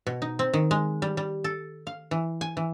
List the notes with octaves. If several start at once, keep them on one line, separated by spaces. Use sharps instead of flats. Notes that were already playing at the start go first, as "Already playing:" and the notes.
B2
D#4
C4
D#3
G#3
G3
G3
A4
F5
E3
G#5
E3